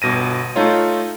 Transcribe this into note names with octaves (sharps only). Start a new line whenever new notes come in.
G1 B2 A#6 D#7
A3 D#4 F4 C#5